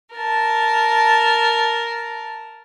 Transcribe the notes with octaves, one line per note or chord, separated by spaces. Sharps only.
A#4 A5